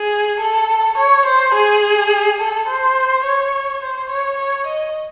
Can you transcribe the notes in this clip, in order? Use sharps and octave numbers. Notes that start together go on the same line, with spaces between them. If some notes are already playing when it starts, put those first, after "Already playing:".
Already playing: G#4
A4
C#5
C5
G#4
A4
C5
C#5
C5
C#5
C#5
D#5